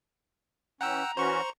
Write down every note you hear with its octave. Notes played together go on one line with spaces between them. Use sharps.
E3 C#4 F#5 G5 A#5 E6
E3 C#4 F#4 C5 C#6